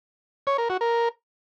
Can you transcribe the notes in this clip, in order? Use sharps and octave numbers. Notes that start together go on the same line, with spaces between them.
C#5
A#4
F#4
A#4